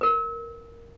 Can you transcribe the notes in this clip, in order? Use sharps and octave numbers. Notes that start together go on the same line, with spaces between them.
A#4 B4